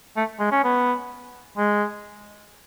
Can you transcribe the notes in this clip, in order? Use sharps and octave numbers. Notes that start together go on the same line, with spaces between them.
A3
G#3
C#4
B3
G#3